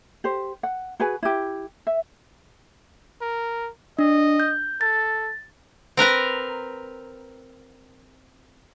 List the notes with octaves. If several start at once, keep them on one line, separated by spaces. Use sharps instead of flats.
G4 C5
F#5
F#4 G#4 B4 G#5
E4 G4
E5
A#4
D4 D#5
G6
A4 A6
C4 A#4 B4 A#5